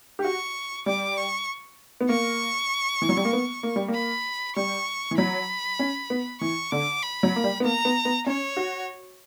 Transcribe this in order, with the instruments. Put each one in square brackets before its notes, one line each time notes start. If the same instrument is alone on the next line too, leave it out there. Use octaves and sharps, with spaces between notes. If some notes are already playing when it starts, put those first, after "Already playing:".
[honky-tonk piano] G4
[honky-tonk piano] F#4 [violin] C#6
[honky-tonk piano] G3 [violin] D6
[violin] C#6
[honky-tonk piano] B3
[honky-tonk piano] A#3 [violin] C#6
[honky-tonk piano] E3
F#3
G3
A#3
B3
A#3
G3
A#3
[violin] B5
[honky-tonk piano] G3 [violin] C#6
[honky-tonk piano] E3
[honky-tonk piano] F#3 [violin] B5
[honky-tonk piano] C#4
B3
[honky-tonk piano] E3 [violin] C#6
[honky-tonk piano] D3 [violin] D6
[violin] B5
[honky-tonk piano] F#3
A#3
G3
B3
[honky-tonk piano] A#3 [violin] A#5
[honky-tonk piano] B3
B3
[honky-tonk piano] C#4 [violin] C#5
[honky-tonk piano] F#4